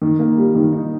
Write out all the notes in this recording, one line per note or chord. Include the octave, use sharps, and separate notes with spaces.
D#3
A#3
G3
D#3
D#4